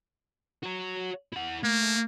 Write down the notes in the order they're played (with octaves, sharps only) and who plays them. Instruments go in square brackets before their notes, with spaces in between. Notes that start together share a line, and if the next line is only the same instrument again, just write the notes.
[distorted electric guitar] F#4 C#5
E4 F#5
[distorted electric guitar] A3 [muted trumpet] A#3